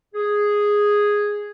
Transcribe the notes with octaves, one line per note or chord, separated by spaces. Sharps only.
G#4